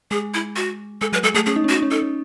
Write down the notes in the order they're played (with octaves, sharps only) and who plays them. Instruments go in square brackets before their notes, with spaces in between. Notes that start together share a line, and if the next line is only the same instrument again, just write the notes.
[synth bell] G#3 [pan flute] G#4
[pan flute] E4
F#4
[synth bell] G#3 [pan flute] A4
[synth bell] F#3 [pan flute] B4
[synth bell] G#3 [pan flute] A4
[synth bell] A3 [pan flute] G#4
[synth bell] C#4 [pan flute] G#4
[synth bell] D#4
C#4
[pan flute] F#4
[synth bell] D#4
C#4
[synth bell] D#4 [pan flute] A4
[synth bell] C#4